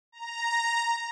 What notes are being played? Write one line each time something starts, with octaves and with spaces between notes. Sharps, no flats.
A#5